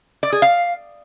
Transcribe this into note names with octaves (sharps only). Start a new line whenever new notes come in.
D5
G#4
F5